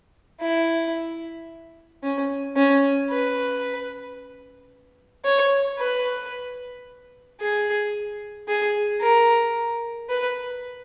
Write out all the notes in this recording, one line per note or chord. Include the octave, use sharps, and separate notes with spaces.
E4
C#4
C#4
B4
C#5
B4
G#4
G#4
A#4
B4